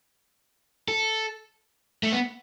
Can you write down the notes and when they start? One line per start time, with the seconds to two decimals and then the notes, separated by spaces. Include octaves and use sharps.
0.88 A4
2.03 A3
2.12 B3